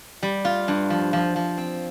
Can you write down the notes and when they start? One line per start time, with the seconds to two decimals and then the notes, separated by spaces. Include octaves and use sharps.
0.23 G3
0.45 F4
0.68 G2
0.90 F3
1.13 F3
1.36 F3
1.58 C4